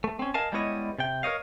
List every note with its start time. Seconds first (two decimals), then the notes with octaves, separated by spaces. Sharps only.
0.04 A3
0.19 C4 C#4
0.34 A#4 D#5 F5 G#5 A5
0.52 G3 G#3 B3 E4 C#5 D#5
0.98 C3 G5
1.23 A#4 C5 C#5 D#5 F5